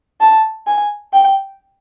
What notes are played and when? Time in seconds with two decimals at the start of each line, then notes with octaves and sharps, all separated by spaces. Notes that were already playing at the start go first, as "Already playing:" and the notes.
0.20 A5
0.67 G#5
1.13 G5